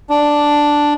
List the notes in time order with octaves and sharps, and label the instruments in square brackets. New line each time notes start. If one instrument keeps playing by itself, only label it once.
[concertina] D4